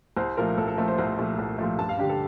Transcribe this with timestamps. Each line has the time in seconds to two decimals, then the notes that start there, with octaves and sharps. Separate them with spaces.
0.17 C2 C5
0.37 A#2 F3 A3 A#4
0.58 C2 A4
0.68 A4
0.77 A#2 F3 A3 A#4
0.88 C5
0.98 C2 C5
1.18 A#2 F3 A3
1.38 C2
1.58 A#2 F3 A3
1.79 G2 A5
1.89 F5
1.99 D3 G3 D4 G4
2.10 A4